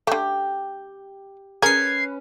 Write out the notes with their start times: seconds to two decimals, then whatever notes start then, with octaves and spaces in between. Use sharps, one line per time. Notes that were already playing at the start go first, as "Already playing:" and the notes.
0.07 D3 A3 G4
1.62 C#4 G#4 A#4 B4 G#6 C7